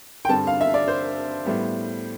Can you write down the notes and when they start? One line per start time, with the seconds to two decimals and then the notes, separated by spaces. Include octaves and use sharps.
0.25 G5
0.29 G2 D3 G3 C4 A5
0.47 F5
0.61 E5
0.74 D5
0.88 C5
1.45 A2 G3 B3